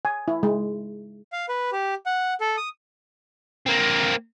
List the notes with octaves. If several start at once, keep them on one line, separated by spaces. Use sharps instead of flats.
G#5
E4
G#3
F5
B4
G4
F#5
A4
D#6
A#3 C4